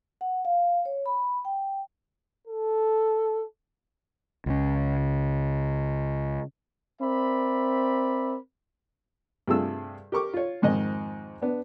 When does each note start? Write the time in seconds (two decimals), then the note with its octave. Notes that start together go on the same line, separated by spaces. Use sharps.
0.21 F#5
0.45 F5
0.85 C#5
1.06 B5
1.45 G5
2.48 A4
4.46 C#2 C#3
7.01 C4 A#4 D5 E5 B5
9.48 G2 C3 A3 F4 G#4 E6
10.12 G4 A#4 C#6 D6
10.33 F4 C#5
10.62 F2 G#2 D#3 D#5
11.42 B3 D4